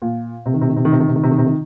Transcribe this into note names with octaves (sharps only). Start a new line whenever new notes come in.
A#2
C3
D#3
C3
D#3
C3
D#3
C3
D#3
C3
D#3
C3
D#3
C3
D#3